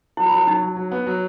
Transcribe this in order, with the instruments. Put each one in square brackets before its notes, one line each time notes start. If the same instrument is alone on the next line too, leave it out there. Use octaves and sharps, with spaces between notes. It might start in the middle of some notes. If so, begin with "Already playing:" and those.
[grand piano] F#3 [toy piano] E4
[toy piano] F4
[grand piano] F#3 [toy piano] E4
[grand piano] F#3 [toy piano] D#4
[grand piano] F#3
F#3
B3
F#3